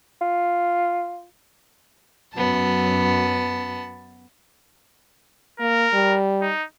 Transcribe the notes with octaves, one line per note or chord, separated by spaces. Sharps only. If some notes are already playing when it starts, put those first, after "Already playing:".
F4
F#2 B3 A5
A#3 A#4
G3
D#4